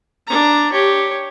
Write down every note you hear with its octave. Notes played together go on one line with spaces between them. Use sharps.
D4 A#5
G4 C#5